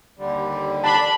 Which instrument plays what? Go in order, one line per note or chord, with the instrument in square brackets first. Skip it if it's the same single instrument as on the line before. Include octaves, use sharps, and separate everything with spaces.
[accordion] D#2 D3 G3
[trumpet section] D4 B5 [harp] A5